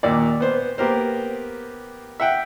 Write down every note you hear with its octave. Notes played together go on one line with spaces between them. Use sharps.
D#2 A#2 D5
B3 C5
A#3 B3 G4 A#4 C5
E5 F#5 G5